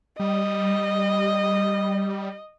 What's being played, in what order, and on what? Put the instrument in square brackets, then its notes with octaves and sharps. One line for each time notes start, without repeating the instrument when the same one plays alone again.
[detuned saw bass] G3 [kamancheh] D#5